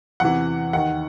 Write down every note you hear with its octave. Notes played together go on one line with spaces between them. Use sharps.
E2 C3 E3 F#5
D#2 D#3 F#5